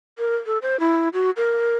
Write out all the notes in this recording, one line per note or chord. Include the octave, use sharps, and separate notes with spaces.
A#4
A4
C5
E4
F#4
A#4